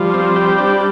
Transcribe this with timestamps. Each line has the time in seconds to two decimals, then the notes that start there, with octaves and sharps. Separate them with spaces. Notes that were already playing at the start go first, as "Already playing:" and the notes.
Already playing: F3 G3
0.14 C4
0.36 G4
0.58 D4